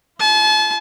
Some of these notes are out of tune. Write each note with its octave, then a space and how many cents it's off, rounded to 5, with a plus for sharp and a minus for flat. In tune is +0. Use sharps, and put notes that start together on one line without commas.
F4 -40 A5 -40